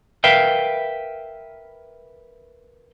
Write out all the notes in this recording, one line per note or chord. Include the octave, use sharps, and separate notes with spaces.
A#4 B4 E5 F5 G5